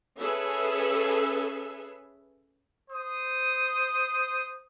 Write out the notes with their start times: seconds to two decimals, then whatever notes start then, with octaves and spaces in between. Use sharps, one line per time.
0.17 C#4 G#4 A4 B4 E5
2.90 C5 D#6